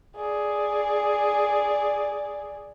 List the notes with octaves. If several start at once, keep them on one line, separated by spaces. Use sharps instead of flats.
G#4 D5